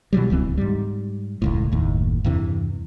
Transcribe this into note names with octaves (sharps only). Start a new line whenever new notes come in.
B2 E3 F#3 G3
D1 C#2 E3 C4
G#2 G3
E1 C#2 A2
F#1 D#2 A2
E2 G2 C3 E3